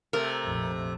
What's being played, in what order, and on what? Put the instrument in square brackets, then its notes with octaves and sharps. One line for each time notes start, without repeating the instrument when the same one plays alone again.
[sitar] C3 A3 [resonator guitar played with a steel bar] A#4
[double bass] A#1 F2